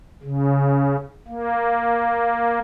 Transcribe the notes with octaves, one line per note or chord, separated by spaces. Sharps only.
C#3
A#3